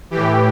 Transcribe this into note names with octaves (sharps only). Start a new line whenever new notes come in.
A2 E3 G4